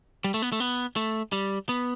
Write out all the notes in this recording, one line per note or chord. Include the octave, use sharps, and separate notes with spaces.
G3
A3
B3
A3
B3
A3
G3
B3